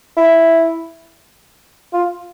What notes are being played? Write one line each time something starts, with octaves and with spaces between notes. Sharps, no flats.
E4
F4